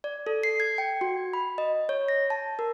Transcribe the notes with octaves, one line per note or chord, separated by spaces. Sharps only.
D5
A4
C7
G#6
G5
F#4
B5
D#5
C#5
A#6
A5
A#4